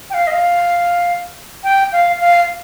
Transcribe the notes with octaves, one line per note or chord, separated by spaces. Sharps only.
G5
F5
D#5
F5
G5
F5
F5